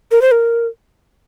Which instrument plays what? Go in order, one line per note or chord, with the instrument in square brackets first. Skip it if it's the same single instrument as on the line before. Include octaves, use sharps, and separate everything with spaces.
[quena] A#4
C5
A#4